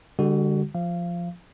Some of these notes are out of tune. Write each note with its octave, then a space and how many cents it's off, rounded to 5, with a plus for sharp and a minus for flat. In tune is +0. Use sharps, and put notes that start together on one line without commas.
D3 +0 G3 +45 F#4 +20
F3 +0 F5 -25